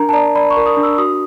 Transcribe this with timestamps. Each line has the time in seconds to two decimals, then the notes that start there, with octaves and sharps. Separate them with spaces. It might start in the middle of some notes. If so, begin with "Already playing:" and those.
Already playing: D4 A#4 A#5
0.09 A5
0.13 D5 A#5
0.35 D5 B5
0.50 C#6
0.57 A#4
0.66 D#6
0.77 D4
0.83 E6
0.98 F#4 D#6